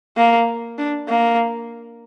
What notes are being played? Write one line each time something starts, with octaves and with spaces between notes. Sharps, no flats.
A#3
D4
A#3